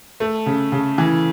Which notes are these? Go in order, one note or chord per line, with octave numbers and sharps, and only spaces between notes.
A3
C#3
C#3
E3